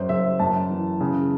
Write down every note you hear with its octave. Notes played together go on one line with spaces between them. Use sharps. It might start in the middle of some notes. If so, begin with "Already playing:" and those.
Already playing: F#2 C5
F#1 E5
F#2 A5
E3
C#3